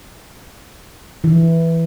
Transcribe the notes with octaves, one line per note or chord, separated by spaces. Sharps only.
E3